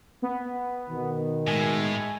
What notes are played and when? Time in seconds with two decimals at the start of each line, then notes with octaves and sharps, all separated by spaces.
0.22 B3
0.89 B2 D#3
1.47 A2 G#3 G#5